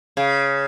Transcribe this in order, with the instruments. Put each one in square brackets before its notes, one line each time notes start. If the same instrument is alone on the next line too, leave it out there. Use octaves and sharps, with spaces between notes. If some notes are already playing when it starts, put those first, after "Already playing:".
[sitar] C#3